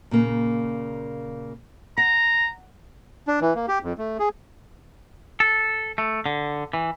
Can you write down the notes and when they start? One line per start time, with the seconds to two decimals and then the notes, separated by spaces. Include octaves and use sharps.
0.11 A#2 C#3 A#3
1.98 F#5 A#5
3.27 D4
3.41 E3
3.55 A#3
3.68 G4
3.83 F2
3.98 A3
4.19 G#4
5.40 A4
5.98 A3
6.26 D3
6.73 E3